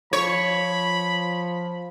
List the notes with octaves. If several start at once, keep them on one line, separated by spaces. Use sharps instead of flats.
F3 C#5 B5